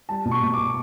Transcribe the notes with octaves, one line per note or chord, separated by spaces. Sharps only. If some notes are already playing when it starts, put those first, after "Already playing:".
G3 A5
B2
C#6
B2
D6